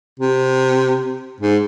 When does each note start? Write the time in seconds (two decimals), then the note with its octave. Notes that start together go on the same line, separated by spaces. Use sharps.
0.20 C3
1.41 G#2